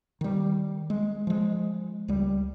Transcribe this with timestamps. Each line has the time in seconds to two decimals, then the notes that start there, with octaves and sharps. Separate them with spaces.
0.21 D#3 G3
0.90 G#3
1.27 F3 G#3
2.08 C#2 G3